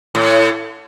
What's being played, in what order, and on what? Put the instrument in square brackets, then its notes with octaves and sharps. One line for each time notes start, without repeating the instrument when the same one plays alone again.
[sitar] A2